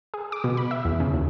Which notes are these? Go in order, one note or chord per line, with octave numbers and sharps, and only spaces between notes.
G#4
D6
B2
B5
E5
E2
C#3
D#2